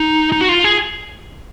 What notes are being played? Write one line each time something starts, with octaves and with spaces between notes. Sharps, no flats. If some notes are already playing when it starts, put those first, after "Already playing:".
Already playing: D#4
D#4
F#4
F4
G#4